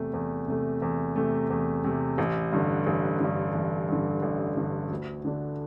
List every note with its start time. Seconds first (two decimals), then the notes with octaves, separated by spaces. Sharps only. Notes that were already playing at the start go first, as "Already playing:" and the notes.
Already playing: E2 C3 A3
0.14 E2
0.48 C3 A3
0.82 E2
1.16 C3 A3
1.50 E2
1.84 C3 A3
2.18 A1
2.52 G2 D3
2.87 A1
3.20 G2 D3
3.55 A1
3.88 G2 D3
4.22 A1
4.57 G2 D3
4.91 D2
5.25 D3 A3 D4